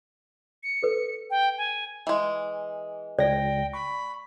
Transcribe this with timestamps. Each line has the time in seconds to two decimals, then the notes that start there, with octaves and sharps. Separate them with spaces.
0.63 C#7
0.83 A4 B4
1.30 G5
1.58 G#5
2.07 E3 G#3
3.19 C#2 D5 G5 A#6
3.73 B5 C#6